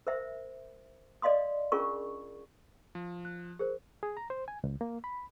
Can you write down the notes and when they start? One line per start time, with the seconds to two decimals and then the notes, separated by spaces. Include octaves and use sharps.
0.07 A#4 C5 E5
1.22 D5 D#5 F5 C6 D#6
1.72 C#4 D4 F4 G#4 A#4 C#6
2.95 F3
3.25 F#6
3.59 G#4 A#4 C5
4.03 G#4
4.17 A#5
4.30 C5
4.48 G#5
4.64 C#2
4.81 A#3
5.04 B5